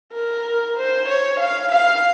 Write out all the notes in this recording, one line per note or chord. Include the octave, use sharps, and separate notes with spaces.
A#4
C5
C#5
F5
F5